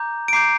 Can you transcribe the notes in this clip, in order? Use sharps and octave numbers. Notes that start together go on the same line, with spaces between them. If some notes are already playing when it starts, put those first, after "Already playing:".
Already playing: A#5 D6 G6
D7
A#5 D6 G6 C7